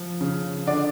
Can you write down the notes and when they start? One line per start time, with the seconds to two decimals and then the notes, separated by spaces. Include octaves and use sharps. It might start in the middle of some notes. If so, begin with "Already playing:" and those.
Already playing: F3
0.21 C#3
0.67 D3 D5